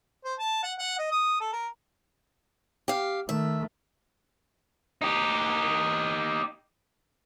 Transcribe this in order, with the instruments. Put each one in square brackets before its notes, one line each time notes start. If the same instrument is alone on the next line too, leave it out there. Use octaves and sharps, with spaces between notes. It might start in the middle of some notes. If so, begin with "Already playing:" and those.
[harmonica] C5
A5
F#5
F#5
D#5
D#6
A4
A#4
[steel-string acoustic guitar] G4 F5
[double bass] D#3 A3 [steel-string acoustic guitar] E5
[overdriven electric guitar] D#4 G4